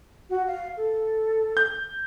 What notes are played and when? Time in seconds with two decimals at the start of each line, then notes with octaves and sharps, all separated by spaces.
0.30 F#4
0.47 F5
0.77 A4
1.57 G6